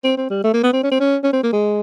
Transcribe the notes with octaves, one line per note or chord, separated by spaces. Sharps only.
C4
C4
G3
A3
A#3
B3
C4
C#4
C4
C#4
C#4
C4
A#3
G#3